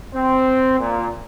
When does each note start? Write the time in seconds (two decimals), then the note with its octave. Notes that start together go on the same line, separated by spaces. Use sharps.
0.14 C4
0.79 A#2